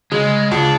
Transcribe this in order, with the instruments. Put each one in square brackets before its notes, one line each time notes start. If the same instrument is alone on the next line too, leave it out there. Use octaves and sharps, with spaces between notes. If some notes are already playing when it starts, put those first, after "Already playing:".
[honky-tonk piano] C#3 [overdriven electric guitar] G#3
[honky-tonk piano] C#2 [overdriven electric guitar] D4